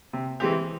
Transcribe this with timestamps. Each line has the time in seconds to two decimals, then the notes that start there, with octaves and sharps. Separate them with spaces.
0.13 C3
0.40 E3 G#3 C4 G4